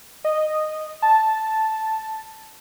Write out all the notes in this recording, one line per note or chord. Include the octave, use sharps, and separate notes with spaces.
D#5
A5